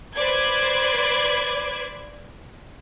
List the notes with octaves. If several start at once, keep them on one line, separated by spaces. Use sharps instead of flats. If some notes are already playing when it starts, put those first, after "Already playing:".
B4 C5 D5 G#6